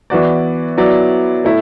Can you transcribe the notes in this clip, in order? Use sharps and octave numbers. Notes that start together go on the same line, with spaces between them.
E3 B3 F#4 D5
F#3 B3 E4 D5
A3 E4